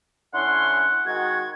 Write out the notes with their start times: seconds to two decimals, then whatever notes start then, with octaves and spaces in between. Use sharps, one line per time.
0.34 D3 C#4 E4 F#5 C6
1.06 D#3 G#3 F#4 G#6